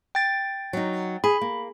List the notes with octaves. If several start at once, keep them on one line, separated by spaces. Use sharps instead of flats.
G5 A6
F#3 D#4
G#4 B5
A#3